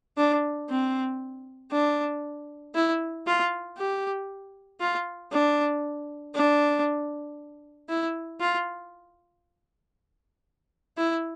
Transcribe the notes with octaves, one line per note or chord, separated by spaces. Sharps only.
D4
C4
D4
E4
F4
G4
F4
D4
D4
E4
F4
E4